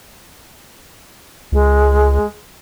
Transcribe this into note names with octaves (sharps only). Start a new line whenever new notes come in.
C#2 G#3